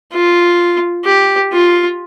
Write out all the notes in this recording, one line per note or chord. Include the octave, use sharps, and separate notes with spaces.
F4
G4
F4